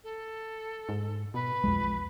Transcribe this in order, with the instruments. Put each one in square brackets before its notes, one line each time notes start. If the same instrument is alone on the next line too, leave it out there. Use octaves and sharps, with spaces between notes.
[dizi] A4
[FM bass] G#2
[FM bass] B2 [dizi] B4
[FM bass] B1 [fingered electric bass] F2 G#3